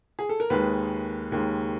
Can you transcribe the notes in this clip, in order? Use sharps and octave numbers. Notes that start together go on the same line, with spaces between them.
G#4
A4
A#4
D#2 D#3 G#3 B4
D#2 D#3 G#3